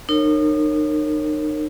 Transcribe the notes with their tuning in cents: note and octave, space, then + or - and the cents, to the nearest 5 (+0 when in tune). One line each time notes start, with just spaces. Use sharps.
D#4 -35 A#4 -20 C#5 -20